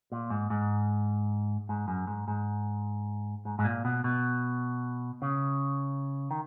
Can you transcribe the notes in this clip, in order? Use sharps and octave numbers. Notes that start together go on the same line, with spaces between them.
A#2
G#2
G#2
G#2
F#2
G#2
G#2
G#2
G#2
A#2
B2
B2
C#3
D#3